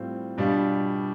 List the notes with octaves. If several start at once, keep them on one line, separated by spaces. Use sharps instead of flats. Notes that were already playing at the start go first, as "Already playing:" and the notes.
Already playing: A2 G3 C4 F4
B2 G3 D4 F4